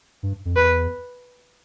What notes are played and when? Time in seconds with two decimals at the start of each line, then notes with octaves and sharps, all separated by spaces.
0.23 G2
0.45 F2
0.56 E2 B4